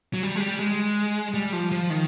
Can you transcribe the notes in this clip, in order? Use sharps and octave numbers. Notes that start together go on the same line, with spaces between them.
F#3
G3
G#3
G3
G#3
G3
F3
F3
D#3